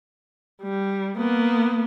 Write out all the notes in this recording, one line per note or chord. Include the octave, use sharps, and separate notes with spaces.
G3
A#3 B3